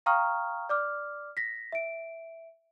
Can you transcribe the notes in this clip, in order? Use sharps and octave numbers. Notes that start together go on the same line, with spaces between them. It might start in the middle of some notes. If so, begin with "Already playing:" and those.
F5 G5 A#5 C#6 D#6 F6
D5 D6 F6
A#6 B6
E5 D7